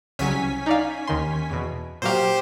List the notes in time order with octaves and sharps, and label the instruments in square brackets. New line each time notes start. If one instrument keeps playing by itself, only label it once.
[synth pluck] C2 C#3 F#3 [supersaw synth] C#4 G#5 B6
[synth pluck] D#4 D5 F5
D#2 D#3 C6
E2 B2
[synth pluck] A#2 F#3 F5 [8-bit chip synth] G4 C5